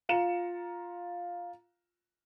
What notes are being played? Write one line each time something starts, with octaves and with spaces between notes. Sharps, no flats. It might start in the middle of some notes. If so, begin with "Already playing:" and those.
F4 A#5 C#7 E7